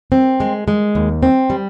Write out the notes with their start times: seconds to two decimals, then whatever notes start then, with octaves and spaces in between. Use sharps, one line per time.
0.12 C4
0.40 G#3
0.68 G#3
0.95 D#2
1.23 C4
1.50 G3